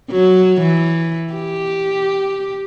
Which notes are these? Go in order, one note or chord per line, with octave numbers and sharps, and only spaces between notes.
F#3
E3
G4